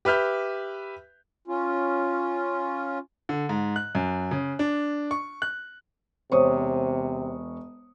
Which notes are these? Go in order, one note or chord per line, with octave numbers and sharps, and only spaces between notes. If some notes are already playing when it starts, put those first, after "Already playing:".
G4 B4 E5 F6 G6
C#4 F4
D3
G#2
F#6
F#2
C#3
D4
C#6
F#6
E1 C3 C5 C#5 C#6 D#6